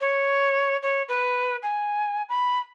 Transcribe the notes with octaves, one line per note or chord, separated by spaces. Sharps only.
C#5
C#5
B4
G#5
B5